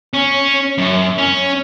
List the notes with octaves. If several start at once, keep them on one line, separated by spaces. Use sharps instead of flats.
C#4
F#2
C#4